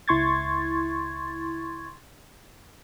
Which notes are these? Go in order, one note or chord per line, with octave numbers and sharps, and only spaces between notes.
C#2 E4 C6 C#6 G#6 A6